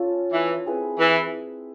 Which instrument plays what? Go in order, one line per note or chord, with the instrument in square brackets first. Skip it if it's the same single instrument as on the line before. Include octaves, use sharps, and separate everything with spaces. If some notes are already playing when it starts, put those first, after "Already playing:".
Already playing: [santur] C#4 F4 A4 C#5
[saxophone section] E3
[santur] C4 E4 G#4 B4
[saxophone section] E3